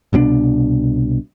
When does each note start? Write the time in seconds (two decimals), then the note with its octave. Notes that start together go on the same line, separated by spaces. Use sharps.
0.13 C2 B2 E3 D4